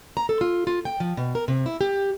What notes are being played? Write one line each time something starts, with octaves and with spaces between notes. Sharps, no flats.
A#5
A4
F4
F4
G5
F3
B2
A#4
C3
E4
G4